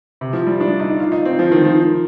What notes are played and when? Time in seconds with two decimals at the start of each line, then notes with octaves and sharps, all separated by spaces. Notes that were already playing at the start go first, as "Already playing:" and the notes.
0.21 C3
0.33 F3
0.46 G3
0.60 D4
0.80 D#4
1.00 F4
1.12 D#4
1.25 C4
1.39 F3
1.52 D#3
1.65 F3